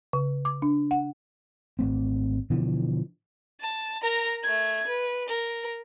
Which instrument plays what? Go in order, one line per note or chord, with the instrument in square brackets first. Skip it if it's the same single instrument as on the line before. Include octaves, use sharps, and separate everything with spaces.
[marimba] C#3
D6
D4
F#5
[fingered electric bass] G#1 A3 C4
B2 D3 E3 F3
[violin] A5
A#4 A#5
A3 G#6
B4
A#4